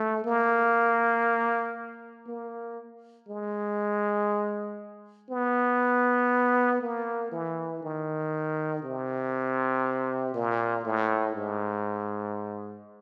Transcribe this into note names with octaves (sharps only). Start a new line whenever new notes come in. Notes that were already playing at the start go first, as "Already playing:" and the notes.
Already playing: A3
A#3
A#3
G#3
B3
A#3
E3
D#3
C3
A#2
A2
G#2